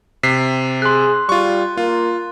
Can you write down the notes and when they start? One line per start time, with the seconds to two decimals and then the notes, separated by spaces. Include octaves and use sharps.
0.23 C3 B6 C7
0.82 G#4 C6 F#6
1.29 G3 F4 C#6
1.77 A#3 F4